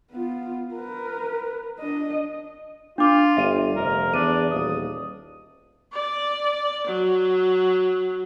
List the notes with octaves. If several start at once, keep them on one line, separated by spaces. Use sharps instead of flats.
B3 F4
A#4 B4
D4 D#5
D4 F4 D6
G1 E5 D#7
F1 A#4
E2 D4 D#7
D#1 D#6
D5
F#3